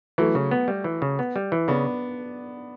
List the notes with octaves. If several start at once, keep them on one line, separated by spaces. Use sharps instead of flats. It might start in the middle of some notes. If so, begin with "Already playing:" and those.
E3 F#3 A3
C#3
B3
G3
E3
C#3
B3
G3
E3
C#3 B3 D4